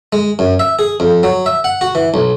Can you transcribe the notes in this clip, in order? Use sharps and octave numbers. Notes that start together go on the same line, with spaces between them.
G#3
F#2
E5
G#4
F2
F#3
E5
F#5
F#4
E3
B1